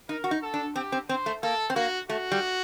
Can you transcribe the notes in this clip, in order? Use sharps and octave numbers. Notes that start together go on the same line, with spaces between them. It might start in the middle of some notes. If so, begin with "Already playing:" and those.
D#4 A#4
F#4
D#4
A4
D4
C4 G4
C4
C4 C5
A3
A#3 A4
C4
A#3 F#4
A3 F#4
G3